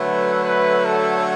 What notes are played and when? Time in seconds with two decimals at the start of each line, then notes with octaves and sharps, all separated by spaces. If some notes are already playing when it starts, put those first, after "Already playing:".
Already playing: D3 F#3 A3 B4
0.45 B4
0.85 A4